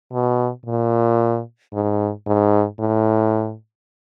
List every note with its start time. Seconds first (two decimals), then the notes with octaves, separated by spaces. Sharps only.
0.13 B2
0.66 A#2
1.74 G#2
2.27 G#2
2.80 A2